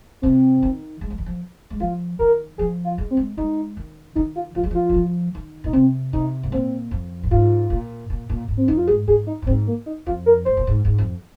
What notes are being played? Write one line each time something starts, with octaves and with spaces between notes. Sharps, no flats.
C3 C4
D#3
G#3
F3
D#3
F3
G#3
F3 F4
D#3 A#4
F3 G#4
F4
G#3
C4
G#3
G#3 D#4
D#3
D#3 D#4
F4
F3 F4
G#3
F3 F4
G#3
F3
D#3
A#2 D#4
C3 C4
C3 D#4
G#2
A#2 C4
F2
A#2
G#2 F4
A#2
A#2
A#2
G#2
C4
F2 D#4
F4
G#2 G#4
G#2 G#4
D#4
A#2
G#2 C4
A#3
D#4
F2 F4
A#4
G#2 C5
A#2
G#2
G#2
F2